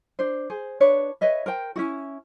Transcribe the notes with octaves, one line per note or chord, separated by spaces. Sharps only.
D4 C5
G#4 C5
D4 B4 C#5
B4 C#5 D#5 E5
A#4 C5 G5
C#4 E4 F#4